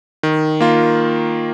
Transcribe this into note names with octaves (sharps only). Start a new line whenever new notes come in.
D#3
A#3 F4